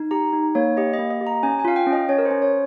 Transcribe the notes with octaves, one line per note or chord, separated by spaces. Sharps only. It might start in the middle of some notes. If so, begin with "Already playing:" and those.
Already playing: D#4
G4 A#5
D#4
A#3 C#5
G4 D#5
D#5
A#3
D#5
G4
A#5
C#4 G#5
G#5
F4 F5
G5
C#4
D#5
C#4 C#5
A#4
C5
C#4
C#5